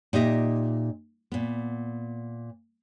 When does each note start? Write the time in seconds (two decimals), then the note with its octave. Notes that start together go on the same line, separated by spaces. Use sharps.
0.13 A#2 D#4 G4 D#5 E5
1.32 A#2 B3